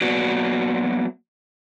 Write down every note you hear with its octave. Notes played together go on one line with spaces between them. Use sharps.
F#3 A#3 B3 F#4 D5